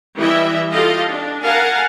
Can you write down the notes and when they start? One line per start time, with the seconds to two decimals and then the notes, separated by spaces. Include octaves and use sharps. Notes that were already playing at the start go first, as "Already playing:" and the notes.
0.16 E3 G3 E4 D#5 E5
0.71 F4 G4 A4 D#5 F5
1.08 D4
1.43 A#4 F5 F#5 G#5 A5